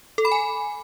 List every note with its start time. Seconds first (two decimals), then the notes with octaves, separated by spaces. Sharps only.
0.18 A4
0.25 B5
0.32 G#5